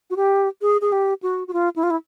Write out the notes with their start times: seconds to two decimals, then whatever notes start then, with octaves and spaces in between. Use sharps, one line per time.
0.10 F#4
0.16 G4
0.62 G#4
0.81 G#4
0.92 G4
1.22 F#4
1.47 F#4
1.53 F4
1.76 E4
1.83 F4
1.90 E4